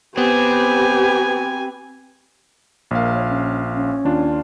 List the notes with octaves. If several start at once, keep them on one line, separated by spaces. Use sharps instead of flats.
B3 C4 G4 B4 G#5
A#1 A#3 F5
C#5
C#4
C#4
D#2 D4 F4